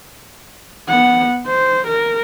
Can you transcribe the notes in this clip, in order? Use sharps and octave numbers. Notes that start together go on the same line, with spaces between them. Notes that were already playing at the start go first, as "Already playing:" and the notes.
B3 F#5
C5
A#4